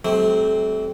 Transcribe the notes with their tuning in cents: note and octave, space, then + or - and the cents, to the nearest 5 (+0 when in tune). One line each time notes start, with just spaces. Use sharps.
F#3 +45 A3 -35 C4 +0